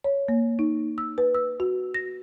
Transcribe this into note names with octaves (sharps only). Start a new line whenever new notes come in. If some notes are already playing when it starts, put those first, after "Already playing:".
C#5
A#3
D#4
E6
B4
E6
F#4
A#6